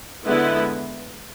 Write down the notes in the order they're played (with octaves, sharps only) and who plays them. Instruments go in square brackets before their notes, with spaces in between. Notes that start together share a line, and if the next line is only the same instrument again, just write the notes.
[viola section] D3 G#3 B3 E4 B4